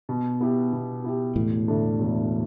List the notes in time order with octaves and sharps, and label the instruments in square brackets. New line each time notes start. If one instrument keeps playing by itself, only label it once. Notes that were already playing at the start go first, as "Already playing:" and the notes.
[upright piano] B2
B3 E4 G4
B2
B3 E4 G4
[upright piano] E1 [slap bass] A2
[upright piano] D2 D3 A3 D4
E1